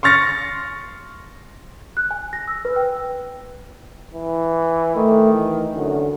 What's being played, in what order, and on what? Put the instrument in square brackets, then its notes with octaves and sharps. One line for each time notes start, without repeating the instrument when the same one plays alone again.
[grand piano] C6 C#6 F6 A6 A#6 C#7
[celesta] F#6
G#5
A#6
E6
B4
G5
[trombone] E3
[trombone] D#3 [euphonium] A3
[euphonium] E3
[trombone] F#2 [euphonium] D3